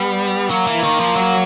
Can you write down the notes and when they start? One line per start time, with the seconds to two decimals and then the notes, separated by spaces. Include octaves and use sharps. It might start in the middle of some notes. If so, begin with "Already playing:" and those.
Already playing: G3 B3
0.50 F#3 A#3
0.67 E3
0.84 D#3
1.00 F3
1.16 F#3